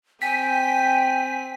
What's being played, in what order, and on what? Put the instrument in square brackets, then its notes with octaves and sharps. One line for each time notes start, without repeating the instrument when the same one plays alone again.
[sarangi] C4 [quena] G5 [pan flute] G#5 [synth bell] B6